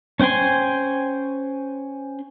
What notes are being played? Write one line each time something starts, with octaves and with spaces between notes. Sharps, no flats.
C#4 C5 G5 G#5 C6